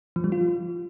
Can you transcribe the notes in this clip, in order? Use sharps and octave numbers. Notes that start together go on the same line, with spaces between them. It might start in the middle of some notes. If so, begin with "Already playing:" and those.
F3
G3
F4